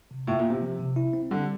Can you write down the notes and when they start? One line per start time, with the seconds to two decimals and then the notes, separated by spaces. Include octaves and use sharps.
0.11 C3
0.27 A2 F4
0.39 A#2
0.45 A#3
0.50 C3
0.62 F3
0.79 C3
0.96 E4
1.13 C4
1.31 D3 G3